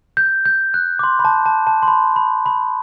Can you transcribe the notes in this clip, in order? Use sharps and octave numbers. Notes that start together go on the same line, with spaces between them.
G6
G6
F#6
D6
C6
B5
A5
A5
A5
C6
B5
B5
B5